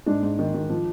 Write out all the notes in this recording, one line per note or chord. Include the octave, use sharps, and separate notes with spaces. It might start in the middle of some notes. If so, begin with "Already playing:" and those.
G#2 D4
G#2
D#3
D#3
F3